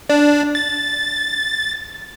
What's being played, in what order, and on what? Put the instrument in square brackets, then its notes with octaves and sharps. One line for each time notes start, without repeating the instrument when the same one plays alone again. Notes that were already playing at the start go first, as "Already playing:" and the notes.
[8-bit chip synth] D4
A6